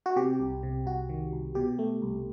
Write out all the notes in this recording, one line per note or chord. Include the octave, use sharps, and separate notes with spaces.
F#4
C3 G4
C2
C3
C2 F#4
D#3
C2
B2 G4
A3
C2